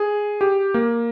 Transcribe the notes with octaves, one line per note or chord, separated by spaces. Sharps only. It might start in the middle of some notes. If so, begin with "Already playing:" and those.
Already playing: G#4
G4
A#3